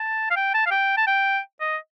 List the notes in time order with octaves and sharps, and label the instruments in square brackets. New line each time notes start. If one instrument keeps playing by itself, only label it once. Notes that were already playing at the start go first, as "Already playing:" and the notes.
Already playing: [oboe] A5
F5
G5
A5
F5
G5
A5
G5
D#5